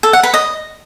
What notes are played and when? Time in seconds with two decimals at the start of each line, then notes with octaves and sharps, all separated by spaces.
0.03 A4
0.13 F#5
0.23 B4
0.34 D#5